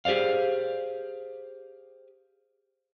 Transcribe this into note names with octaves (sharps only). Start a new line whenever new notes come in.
G4 G#4 C5 D5 F5